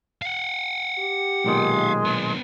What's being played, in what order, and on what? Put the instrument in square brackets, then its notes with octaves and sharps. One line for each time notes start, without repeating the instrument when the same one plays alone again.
[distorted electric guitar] F5 F#5
[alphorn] G4
[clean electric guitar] B1 A#2 D#3 [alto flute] G#3
[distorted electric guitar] B3 D4